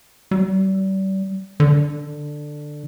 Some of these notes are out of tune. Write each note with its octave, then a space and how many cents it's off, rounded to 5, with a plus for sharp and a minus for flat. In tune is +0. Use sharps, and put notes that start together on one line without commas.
G3 -35
D3 +10